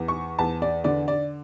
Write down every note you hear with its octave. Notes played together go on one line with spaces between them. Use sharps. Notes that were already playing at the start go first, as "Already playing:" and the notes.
Already playing: E2
C#6
E2 A5
D5
D3 D5
D5